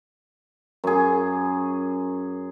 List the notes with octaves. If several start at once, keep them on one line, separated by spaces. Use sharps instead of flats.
F#2 G#4